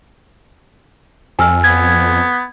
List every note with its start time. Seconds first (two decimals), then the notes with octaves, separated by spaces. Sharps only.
1.39 F2 G#5 E6 F6
1.64 B3 G#6